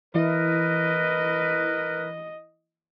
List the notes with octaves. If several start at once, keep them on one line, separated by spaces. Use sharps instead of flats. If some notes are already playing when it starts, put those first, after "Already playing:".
E3 E4 A#4 B4 D#5